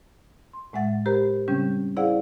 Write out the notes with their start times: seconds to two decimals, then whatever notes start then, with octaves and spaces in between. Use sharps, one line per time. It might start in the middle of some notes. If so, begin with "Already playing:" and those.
0.53 C6
0.73 A2 G#3 E5 F#5 A6
1.06 G4 A#4 C5 A#5 B5
1.48 C#3 G3 C4 C#4 G6
1.97 E4 G#4 C5 D5 F5 F#5